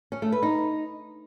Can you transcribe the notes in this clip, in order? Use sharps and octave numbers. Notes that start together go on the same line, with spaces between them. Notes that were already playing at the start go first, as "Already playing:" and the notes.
C#4
A3
B4
D#4